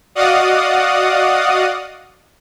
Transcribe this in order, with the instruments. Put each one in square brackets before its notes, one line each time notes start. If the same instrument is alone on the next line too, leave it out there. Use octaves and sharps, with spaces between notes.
[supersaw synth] F#4 D5 D#5 F5 F#5 D#6